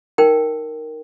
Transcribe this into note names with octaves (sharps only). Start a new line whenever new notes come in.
D#4 A#4 G5